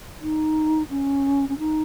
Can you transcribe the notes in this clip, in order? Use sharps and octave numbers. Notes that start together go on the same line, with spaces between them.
D#4
C#4
C#4
D#4